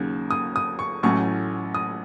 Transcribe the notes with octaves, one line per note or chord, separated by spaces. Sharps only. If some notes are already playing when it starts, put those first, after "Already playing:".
Already playing: D#2 C#3 F#3 A#3
D#6
D#6
C#6
A1 A2 F#3 A3 C#4 C#6
D#6